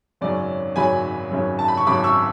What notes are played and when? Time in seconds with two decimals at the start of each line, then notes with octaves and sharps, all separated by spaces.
0.21 G#1 F#2 C#3 F#3 C#4 D5
0.76 G#1 F#2 C#3 F#3 C#4 G#5 B5
1.31 G#1 F#2 C#3 F#3 C#4
1.59 A5
1.68 B5
1.77 C#6
1.86 G#1 F#2 C#3 F#3 C#4 B5 D6
2.04 C#6 E6